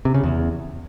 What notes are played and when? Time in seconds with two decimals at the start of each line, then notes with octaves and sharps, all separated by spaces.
0.05 C3
0.14 C#3
0.23 E2